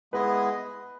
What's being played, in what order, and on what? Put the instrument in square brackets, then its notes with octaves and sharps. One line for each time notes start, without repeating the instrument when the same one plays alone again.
[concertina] G#3 B3 E4 G#4 D#5 [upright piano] B4